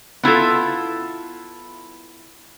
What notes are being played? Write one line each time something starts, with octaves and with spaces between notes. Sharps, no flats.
B3 E4 F4 A4